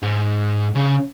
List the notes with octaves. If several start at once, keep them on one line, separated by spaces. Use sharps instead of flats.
G#2
C#3